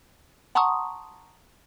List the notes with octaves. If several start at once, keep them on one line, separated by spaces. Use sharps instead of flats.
F#5 A5 A#5 C6 C#6 D#6